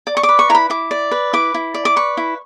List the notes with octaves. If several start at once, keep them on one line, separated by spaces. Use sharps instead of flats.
D5
C#6
D6
B4
C#6
E4 A#5
B5
E4 D6
D5
B4
E4 D6
E4
D5
D6
B4 C#6
E4